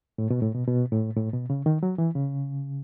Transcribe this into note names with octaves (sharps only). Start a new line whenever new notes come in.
A2
B2
A2
B2
B2
A2
A2
B2
C#3
D#3
F#3
E3
C#3